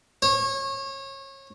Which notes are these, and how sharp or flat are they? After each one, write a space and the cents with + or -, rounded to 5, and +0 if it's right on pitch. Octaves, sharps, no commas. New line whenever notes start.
C#5 -30